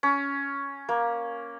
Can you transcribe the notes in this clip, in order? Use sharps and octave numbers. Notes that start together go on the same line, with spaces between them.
C#4
A#3